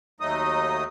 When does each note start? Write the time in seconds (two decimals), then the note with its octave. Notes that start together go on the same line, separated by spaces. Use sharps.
0.20 D#2 F#3 A3 D#4 D#5 D#6